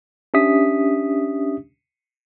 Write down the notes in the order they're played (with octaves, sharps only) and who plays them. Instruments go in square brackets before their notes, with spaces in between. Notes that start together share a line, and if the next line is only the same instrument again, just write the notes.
[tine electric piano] C#4 D4 G4 E5 D#6 B6